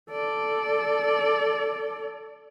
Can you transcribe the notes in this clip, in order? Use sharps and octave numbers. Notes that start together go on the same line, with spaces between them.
A4 D5